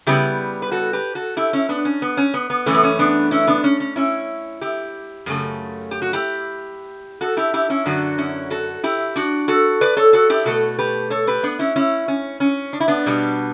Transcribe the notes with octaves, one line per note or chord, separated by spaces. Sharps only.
C#3 G3 B3 E4 G4
B4
F#4 A4
G4 B4
F#4 A4
E4 G4
C#4 E4
B3 D4
C#4
B3
C#4
B3
B3
F#2 E3 A3 C#4
B3
C#4
B3 D4
C#4 E4
B3 D4
C#4
C#4
C#4 E4
E4 G4
F#2 C#3 A3
G4
F#4
E4 G4
F#4 A4
E4 G4
E4 G4
C#4 E4
F#2 D3 F#3 D4 F#4
C#4 E4
F#4 A4
E4 G4
D4 F#4
F#4 A4
B4 D5
A4 C#5
F#4 A4
E4 G4
B2 A3 F#4 A4
G4 B4
A4 C#5
G4 B4
B3 D4
C#4 E4
C#4 E4
C#4
C#4
D4
E4
B3 D4
B2 G3 B3